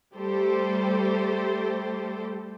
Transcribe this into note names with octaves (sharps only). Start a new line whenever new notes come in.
G3 A3 G4 A4 C5